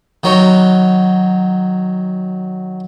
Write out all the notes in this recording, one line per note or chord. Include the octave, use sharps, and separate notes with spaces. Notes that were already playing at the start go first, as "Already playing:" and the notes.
D#3 F#3 C#5